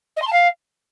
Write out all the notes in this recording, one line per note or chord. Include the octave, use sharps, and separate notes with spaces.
D#5
C6
A5
F5